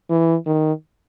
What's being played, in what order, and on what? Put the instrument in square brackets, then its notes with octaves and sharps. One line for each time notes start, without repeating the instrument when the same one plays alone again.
[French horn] E3
D#3